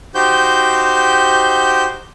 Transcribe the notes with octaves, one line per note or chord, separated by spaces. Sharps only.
D#4 F#4 G4 C5 G6